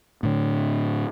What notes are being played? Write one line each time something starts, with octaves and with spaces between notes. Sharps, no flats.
A2 D3